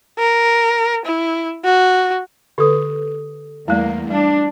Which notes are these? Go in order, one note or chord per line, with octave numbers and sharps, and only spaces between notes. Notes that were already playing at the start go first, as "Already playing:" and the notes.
A#4
E4
F#4
D3 G4 A4 B4 D#6
E2 G3 A3 A#3 E4 D5
G3 D4